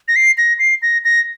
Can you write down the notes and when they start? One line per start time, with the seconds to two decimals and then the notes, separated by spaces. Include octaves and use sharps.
0.08 A#6
0.16 C7
0.38 A#6
0.59 C7
0.83 A#6
1.04 A#6